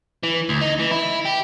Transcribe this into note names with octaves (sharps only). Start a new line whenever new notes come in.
E3
D2
D#4
E3
E4
G4